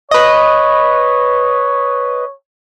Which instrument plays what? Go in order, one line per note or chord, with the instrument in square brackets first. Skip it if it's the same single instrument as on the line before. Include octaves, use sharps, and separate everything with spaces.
[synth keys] B4 D#5 [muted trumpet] C#5